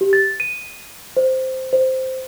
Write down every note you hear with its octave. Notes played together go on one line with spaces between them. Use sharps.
G4
A6
D#7
C5
C5